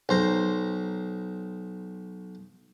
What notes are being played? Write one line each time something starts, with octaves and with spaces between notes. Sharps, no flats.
B1 C5 A#5